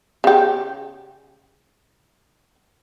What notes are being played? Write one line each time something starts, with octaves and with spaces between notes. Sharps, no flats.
C#3 G4